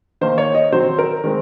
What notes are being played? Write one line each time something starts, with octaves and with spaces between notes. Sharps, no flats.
D#3 A#3 C5
C#5
D#5
D#3 F#3 C4 C5
A#4
D#3 G#3 C4